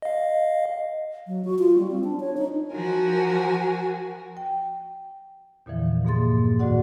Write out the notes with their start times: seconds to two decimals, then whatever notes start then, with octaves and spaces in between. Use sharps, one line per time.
0.02 D#5 F5
1.27 F#3
1.45 F#4
1.59 F4
1.78 G3
1.91 C4
2.04 D4
2.20 C#5
2.37 D#4
2.73 F3 F#4 A#4 G#5
4.37 G5
5.66 E2 A#2 D3 E3 F3
6.05 G2 A#2 A#3 G#4 C6 A6
6.59 D2 A2 D#3 F#4 D5 F#5